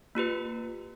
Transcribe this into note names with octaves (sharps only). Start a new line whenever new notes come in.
A#3 F4 G4 B4